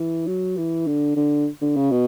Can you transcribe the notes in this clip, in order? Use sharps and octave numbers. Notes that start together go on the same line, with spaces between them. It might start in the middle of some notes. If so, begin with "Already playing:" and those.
Already playing: E3
F#3
E3
D3
D3
D3
C#3
B2